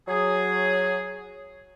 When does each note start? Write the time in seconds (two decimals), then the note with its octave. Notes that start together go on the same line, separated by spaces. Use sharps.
0.08 F#3 G#4